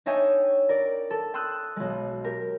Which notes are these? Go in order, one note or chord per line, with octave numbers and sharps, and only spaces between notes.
D4 D#4 C#5 E5 G5 G#5
A#4 D5
A4
G5 C6 D#6 E6 F#6
B1 G#3
G4 A#4